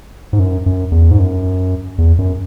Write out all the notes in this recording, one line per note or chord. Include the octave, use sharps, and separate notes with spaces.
G#2
F#2
F#2
E2
G#2
F#2
E2
F#2